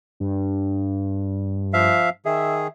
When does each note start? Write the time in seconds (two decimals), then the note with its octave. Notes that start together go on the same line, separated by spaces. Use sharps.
0.20 G2
1.73 F3 E5 F5
2.26 D#3 G#4 E5